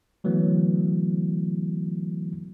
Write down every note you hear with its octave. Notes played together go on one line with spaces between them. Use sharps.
D3 E3 F#3 A3 B3